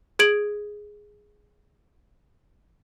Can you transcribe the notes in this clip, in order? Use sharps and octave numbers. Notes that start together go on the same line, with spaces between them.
G#4 G#6 D7 F#7